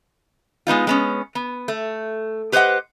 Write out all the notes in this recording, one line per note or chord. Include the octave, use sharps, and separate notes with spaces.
G#3 B3 D#4 F4
G#3 B3 C#4
B3
A3
G4 B4 C5 D5 D#5 F#5